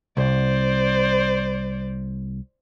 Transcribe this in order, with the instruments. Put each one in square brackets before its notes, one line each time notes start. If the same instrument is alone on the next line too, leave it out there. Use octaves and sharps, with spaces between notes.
[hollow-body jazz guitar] C2 [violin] C5 D5